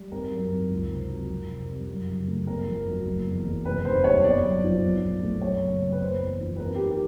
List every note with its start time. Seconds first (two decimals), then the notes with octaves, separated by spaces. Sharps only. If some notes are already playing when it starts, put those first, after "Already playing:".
Already playing: G3
0.11 G#1 A#4
0.31 F#2
0.51 G#1
0.70 C#2
0.90 C3
1.10 F#3
1.30 F2
1.49 C3
1.69 G3
1.89 F#2
2.09 C#3
2.28 A3
2.47 G1 A#4
2.67 F2
2.87 F#3
3.06 F#1
3.26 E2
3.45 F#1
3.65 F1 B4
3.85 D#2 C5
4.04 G3 C#5
4.24 G1 D5
4.44 F#2
4.64 F3
4.83 B1
5.02 A#2
5.23 A3
5.42 F#2 C#5
5.62 C#3
5.82 F#2
5.92 B4
6.00 F#1 C5
6.21 E2
6.40 F3
6.56 B4
6.60 G#1 A#4
6.75 G4
6.80 G#2
6.90 G4